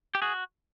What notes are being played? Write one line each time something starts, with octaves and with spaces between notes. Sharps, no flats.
G4
F#4 G#4